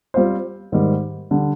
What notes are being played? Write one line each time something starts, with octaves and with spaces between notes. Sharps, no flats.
G3 C4 F4 C5
G#2 D#3 G3
D3 G3